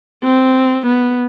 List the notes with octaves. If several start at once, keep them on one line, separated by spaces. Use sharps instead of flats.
C4
B3